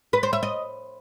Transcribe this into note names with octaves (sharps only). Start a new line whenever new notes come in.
B4
C5
E5
D#5